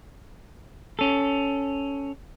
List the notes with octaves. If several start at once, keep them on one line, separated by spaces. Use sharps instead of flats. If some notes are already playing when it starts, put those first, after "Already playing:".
C#4 A4